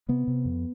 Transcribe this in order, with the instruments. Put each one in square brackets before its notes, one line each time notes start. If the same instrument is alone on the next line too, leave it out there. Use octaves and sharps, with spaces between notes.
[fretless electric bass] C3 B3
C3
F2